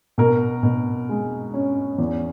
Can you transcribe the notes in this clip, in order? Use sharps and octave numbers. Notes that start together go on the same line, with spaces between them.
B2 A#4
B2
G#3
C#4
E2